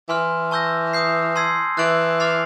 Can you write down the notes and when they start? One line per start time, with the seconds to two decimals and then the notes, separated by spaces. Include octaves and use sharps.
0.09 E3 G#5 C6 F6
0.51 A5 C#6 E6 G6 A#6
0.93 D#6 G6 C7
1.36 A5 C6 E6 G#6 C7
1.78 E3 F#6 A6 D7 F#7
2.20 D6 F6 A6 C7 F7